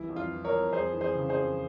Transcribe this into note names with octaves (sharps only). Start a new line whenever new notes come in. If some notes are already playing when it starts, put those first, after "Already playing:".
Already playing: C2 E3 E4
F2
F4
E3
A#4 C#5
F2
F2 G#4 C5
E3
G#4 C5
C#3
G#4 C5
F2